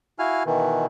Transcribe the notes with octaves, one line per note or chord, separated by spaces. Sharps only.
E4 F#4 F5 G#5 F6
B2 D#3 E3